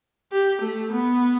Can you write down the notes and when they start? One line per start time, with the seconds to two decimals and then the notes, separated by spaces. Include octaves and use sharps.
0.32 G4
0.62 A3
0.92 B3